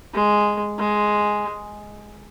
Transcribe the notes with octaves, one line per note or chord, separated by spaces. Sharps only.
G#3
G#3